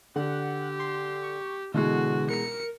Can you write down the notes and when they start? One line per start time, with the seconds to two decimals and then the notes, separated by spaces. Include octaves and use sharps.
0.16 D3 G4 F#5
0.79 C6
1.23 C#6
1.74 B2 D3 E3 G#3 F#4
2.30 A#4 C#7